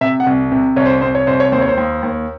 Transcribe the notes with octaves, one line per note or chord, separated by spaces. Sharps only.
C3 E5
F#5
C2
C3
C2 C#5
C5
C2 C5
C#5
C2 C5
C#5
D#2 C5
C#5
C5
D#2
D#2